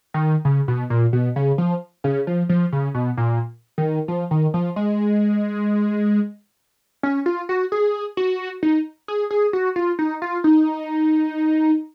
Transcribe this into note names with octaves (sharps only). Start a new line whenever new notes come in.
D#3
C#3
B2
A#2
B2
C#3
F3
C#3
F3
F3
C#3
B2
A#2
D#3
F3
D#3
F3
G#3
C#4
F4
F#4
G#4
F#4
D#4
G#4
G#4
F#4
F4
D#4
F4
D#4